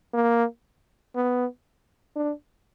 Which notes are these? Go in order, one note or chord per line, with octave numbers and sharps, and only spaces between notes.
A#3
B3
D4